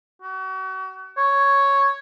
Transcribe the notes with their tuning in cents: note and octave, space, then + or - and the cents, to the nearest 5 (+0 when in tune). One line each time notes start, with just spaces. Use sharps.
F#4 +35
C#5 +0